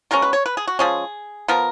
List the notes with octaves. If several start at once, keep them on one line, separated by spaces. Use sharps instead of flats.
B2 G#3 C#4 A#4
B4
C#5
B4
G#4
F#4
F3 G#3 C#4 G#4
F3 B3 A#4